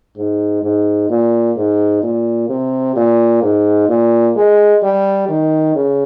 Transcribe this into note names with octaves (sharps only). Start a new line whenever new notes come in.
G#2
G#2
A#2
G#2
A#2
C3
A#2
G#2
A#2
G#3
G3
D#3
C#3